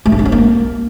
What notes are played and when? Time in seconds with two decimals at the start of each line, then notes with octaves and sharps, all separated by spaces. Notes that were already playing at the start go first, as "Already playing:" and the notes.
0.06 A3
0.12 D#4
0.19 C4
0.25 C#4
0.32 A#3